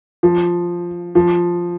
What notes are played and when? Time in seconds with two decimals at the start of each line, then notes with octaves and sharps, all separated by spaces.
0.23 F3
1.15 F3